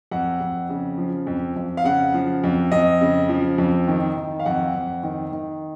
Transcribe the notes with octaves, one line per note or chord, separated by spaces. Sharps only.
F2 F#5
F2
C#3
F3
F2
F2
F5
C#3 F#5
F3
F2
F2 D#5
C#3
F3
F2
D#3
D#3
F5
F2 F#5
F2
D#3
D#3